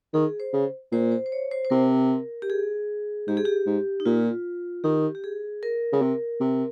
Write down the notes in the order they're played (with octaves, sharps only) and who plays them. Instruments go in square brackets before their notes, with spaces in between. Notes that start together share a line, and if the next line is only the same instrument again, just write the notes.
[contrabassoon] D#3 [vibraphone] G#4
[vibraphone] C5
[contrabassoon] C#3
[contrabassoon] A#2 [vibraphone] C5
[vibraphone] C5
C5
C#5
C5
C5
[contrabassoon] C3 [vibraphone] A#4
[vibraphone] G4
G#4
[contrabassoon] G#2 [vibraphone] G4
[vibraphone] G#4
G4
[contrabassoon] G#2
[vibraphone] D#4
[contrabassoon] A#2 [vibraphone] F4
[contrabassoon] D#3 [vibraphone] G4
[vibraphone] G4
G#4
A#4
[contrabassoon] C#3
C3
C3